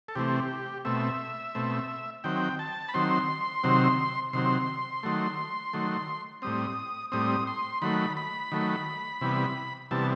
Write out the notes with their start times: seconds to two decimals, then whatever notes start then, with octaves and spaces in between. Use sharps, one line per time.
0.08 A4
0.15 C3 E3 A3 C4 G4
0.85 B2 A3 C4 E5
1.55 B2 A3 C4
2.24 D#3 F#3 C4 G5
2.59 A5
2.89 B5
2.94 D#3 F#3 C4 C6
3.64 C3 D#3 F#3 C4
4.33 C3 D#3 F#3 C4 C6
5.03 D#3 F#3 A3
5.73 D#3 F#3 A3
6.42 A2 G3 C4 D#6
7.12 A2 G3 C4 D#6
7.47 C6
7.82 D#3 F#3 A3 B5
8.17 B5
8.52 D#3 F#3 A3
9.21 C3 E3 G3 B3
9.91 C3 E3 G3 B3 A5